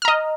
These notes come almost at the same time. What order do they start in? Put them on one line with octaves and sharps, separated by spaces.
F6 A#5 D#5